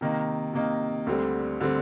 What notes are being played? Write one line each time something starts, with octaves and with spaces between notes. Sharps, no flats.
C3 D#3 A#3 D#4
C3 D#3 A#3 D#4
D2 D3 G3 C4
D3 G3 C4